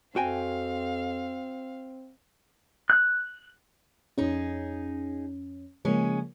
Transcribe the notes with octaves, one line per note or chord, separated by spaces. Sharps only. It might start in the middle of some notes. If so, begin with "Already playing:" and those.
F2 C4 F#4 F5 G5 G#5
F#6
F2 C#4 D#4 G#4
C#3 F3 G#3 A#3 C#4